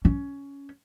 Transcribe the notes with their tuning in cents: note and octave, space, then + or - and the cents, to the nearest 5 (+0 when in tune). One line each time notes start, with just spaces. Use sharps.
C#4 +10